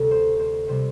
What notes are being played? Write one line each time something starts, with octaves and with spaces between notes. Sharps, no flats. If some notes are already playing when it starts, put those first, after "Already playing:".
Already playing: D2 C3 G3 A4
C5
C5
C3 G3 C5